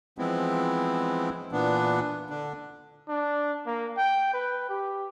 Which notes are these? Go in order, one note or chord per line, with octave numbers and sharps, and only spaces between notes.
E3 F3 G#3 B3 C4 E4
A#2 E3 B3 D4
D3 D4
D4
A#3
G5
B4
G4